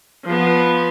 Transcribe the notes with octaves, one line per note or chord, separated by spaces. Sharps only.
F3 B3